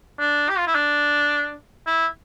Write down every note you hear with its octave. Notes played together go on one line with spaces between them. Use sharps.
D4
G4
F4
E4
D4
E4